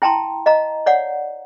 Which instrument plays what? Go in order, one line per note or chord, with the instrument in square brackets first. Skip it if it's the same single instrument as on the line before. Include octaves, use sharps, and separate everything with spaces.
[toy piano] E4 G5 A5 A#5 C6
D#5 F5 A#5
C#5 D5 F5 F#5